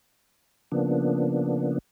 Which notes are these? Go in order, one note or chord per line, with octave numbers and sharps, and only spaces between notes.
C#3 F3 A#3 B3 D4